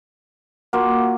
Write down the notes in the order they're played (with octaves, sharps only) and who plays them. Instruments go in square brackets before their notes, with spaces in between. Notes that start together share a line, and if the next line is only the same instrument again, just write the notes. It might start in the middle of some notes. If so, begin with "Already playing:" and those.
[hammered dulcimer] A#3 F4 [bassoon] F#4